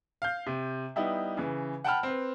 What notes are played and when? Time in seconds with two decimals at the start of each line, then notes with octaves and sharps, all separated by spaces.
0.22 F5 G6
0.47 C3
0.96 G3 B3 D#4 E4 G4
1.37 C#3 E3
1.84 F#5 G5 A5 B5 F6
2.03 C4 B4